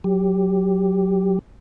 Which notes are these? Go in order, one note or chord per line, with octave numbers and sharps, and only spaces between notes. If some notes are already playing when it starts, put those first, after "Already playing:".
F#3 G4